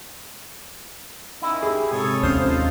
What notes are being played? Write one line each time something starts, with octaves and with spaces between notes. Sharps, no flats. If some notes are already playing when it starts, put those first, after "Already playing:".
D#3 C#4 E4 D#5
G4 G#4
G#2 C3 A4 C#5 D#6
D#2 C#4 F4 C5 D#6 F6
D#4 F4 A4